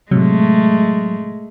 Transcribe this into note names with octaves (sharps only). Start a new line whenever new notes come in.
A2 C3 F#3 G#3 A3